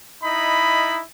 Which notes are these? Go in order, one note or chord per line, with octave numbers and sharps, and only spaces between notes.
D#4 E4 D#5 B5